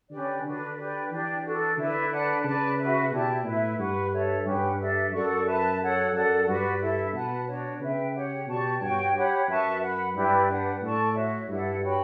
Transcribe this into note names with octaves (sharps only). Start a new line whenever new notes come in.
D3 C#4 G4 B4 D5
D3 D4 F#4 B4
G4 B4 D5
E3 D4 G4 D5
D4 F#4 A4
D3 E4 B4 D5
B4 D5 F#5 A5
C#3 B4 D5 A5
F#4 B4 E5
B2 E4 G4 D5 A5
A2 E4 B4 E5
G2 B4 F#5 C#6
A4 C#5 E5
G2 C#4 G4 B4 F#5
D4 A4 E5
F#2 A4 D5 F#5 C#6
B4 E5 A5
A4 C#5 F#5
F#2 A4 D5 F#5
G2 F#4 B4 D5
E4 A4 E5
B2 B4 F#5 A5
D4 F#4 C#5
C#3 B4 E5 G5
G4 C#5 F#5
B2 G4 D5 A5 C#6
G2 F#4 C#5 G5 C#6
G4 C#5 F#5 B5
F#2 B4 E5 A5 C#6
B4 F#5 B5
G2 E4 G4 B4 D5
D4 G4 B4 F#5
A2 A4 D5 A5 C#6
F#4 C#5 E5
G2 E4 A4 D5 F#5
F#4 C#5 G5 B5